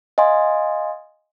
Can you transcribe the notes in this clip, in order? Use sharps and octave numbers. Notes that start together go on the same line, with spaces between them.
D#5 F5 G#5 C6